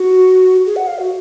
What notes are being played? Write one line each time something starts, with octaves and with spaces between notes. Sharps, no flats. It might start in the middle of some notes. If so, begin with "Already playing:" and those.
Already playing: F#4
G#4
F#5
F5
F#4